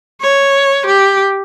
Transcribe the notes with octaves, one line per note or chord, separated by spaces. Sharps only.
C#5
G4